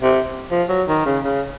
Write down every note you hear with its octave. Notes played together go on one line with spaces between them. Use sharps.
C3
F3
F#3
D#3
C#3
C#3